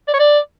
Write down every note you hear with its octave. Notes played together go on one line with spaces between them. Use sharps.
D5
C#5
D5